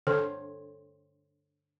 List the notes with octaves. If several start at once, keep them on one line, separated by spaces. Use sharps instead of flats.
D3 A4 C5 C#5